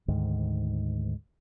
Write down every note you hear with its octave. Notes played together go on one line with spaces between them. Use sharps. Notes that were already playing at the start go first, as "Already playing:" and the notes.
D2 G#2 D#3